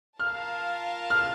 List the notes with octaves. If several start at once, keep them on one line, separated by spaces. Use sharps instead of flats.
F4 A#4 F5 A5 F6
F6